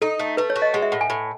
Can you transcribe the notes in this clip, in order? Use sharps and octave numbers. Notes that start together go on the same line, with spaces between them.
D#4 A4
A3
A3 B4
C#5
F#4
D#5
G#3 F#5
E5
A2 F#5
G#5
A2